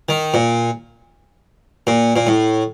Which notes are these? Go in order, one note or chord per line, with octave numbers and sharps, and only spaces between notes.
D#3
A#2
A#2
A#2
A2